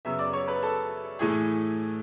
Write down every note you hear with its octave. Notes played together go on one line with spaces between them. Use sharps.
F#2 C#3 F#3 B3 E5 E6
D5 D6
C#5 C#6
B4 B5
A4 A5
A2 E3 A3 G#4 G#5